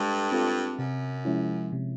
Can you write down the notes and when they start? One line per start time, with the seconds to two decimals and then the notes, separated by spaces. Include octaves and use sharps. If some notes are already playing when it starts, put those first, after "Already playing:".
Already playing: G2 G#3 A4
0.32 C4 F4 A4
0.78 F#2 C3
1.25 F3 G#3 C#4 E4
1.72 C3